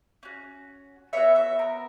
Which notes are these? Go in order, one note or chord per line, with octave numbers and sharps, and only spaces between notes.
C#4 F#4
B3 F#4 C#5 E5
C#5 E5
A#4